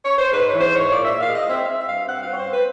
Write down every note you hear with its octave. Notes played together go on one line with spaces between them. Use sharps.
C#5
C5
G#2 B4
C#5
E3
C5
G#2 C#5
A#2 D5
E5
A#2
F5
G#3 D#5
C4 E5
F5
C4 E5
E5
G2 F5
C4 F#5
F5
C4
C#5
C5
C4 B4